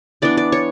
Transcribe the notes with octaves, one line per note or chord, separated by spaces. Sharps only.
E3 B3 D4 D5
D5
C#5